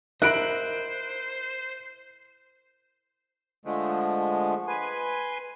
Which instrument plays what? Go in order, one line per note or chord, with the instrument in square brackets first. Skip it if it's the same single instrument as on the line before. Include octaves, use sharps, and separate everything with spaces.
[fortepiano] E4 B5 [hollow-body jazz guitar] A#4 D#5 [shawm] C5 [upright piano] F#6 D7 F#7
[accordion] D3 F3 G#3 A3
B4 G#5 C6